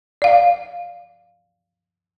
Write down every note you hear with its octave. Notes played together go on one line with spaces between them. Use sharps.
D5 F5